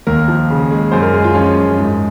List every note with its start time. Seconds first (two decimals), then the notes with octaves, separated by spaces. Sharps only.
0.07 D#2 A#4
0.28 F3
0.50 C#3
0.71 G#3
0.91 F#2 C5
1.02 A#4
1.13 G#3 G#4
1.24 F4
1.34 F3 C#4
1.56 F#2
1.77 G#2